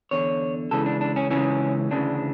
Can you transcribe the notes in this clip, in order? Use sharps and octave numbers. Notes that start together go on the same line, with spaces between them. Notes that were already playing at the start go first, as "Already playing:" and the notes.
E2 D3 C#5
C#2 C#3 E3 A4
D4
D4
C#4
C#2 C#3 E3 C#4
D2 C#3 E3 D4